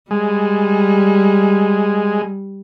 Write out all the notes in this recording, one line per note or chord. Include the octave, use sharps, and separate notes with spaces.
G3 G#3